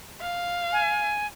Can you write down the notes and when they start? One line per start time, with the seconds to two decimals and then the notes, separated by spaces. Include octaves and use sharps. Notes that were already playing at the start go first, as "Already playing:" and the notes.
0.21 F5
0.72 G#5